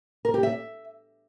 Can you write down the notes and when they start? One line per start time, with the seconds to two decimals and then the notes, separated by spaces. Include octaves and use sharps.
0.25 A#4
0.34 G4
0.43 E5